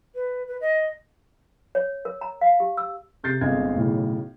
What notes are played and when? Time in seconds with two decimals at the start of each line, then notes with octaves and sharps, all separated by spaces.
0.15 B4
0.47 B4
0.61 D#5
1.75 C#5
2.05 A#4
2.21 A#5
2.41 F5
2.60 G4
2.77 E6
3.24 C3 G6 A6 C7
3.41 G1 G#3 C4 G#6
3.75 B1 A2 C#3